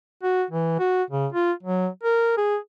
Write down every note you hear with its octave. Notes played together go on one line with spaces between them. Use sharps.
F#4
E3
F#4
C#3
F4
F#3
A#4
G#4